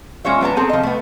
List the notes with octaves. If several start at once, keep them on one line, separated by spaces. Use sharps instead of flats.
G#3 C#4 F4 C#5 E5
F#3 B3 A5 A#5
C4 G#4 A4
F3 D#5
A3 B3